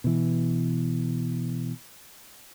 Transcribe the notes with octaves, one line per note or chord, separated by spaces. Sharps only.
B2 E3